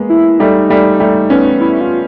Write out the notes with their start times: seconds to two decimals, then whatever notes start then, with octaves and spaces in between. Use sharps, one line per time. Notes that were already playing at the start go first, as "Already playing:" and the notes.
Already playing: G#3 A#3 B3
0.09 E4
0.39 G3 A3 D#4
0.70 G3 A3
1.00 G3 A3
1.30 B3 C#4
1.60 E4
1.81 F4